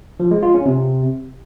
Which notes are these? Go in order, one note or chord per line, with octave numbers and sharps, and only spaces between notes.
F3
G#3
F4
C#4
C3